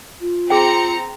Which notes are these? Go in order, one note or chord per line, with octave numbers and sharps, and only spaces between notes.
F4
C4 G#4 G5 A#5 C#7